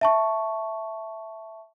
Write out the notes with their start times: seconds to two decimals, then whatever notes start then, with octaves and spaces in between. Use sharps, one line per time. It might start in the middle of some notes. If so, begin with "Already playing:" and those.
0.01 E5 A5 C#6